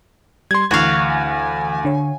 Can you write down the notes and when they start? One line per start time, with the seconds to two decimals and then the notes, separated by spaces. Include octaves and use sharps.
0.51 G3 C6 G#6
0.71 D2 D3 E3 F#4 F5 C#6 G#6
1.07 G#5
1.85 D3 C#5